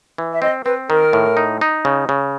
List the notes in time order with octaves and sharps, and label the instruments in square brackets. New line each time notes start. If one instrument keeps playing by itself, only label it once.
[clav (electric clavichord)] E3
[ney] E5
[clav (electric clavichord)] C4 [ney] D#5
[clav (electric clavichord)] C4 [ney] B4
[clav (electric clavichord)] D#3 [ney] A#4
[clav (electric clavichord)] A2
D#4
D#4
C#3
C#3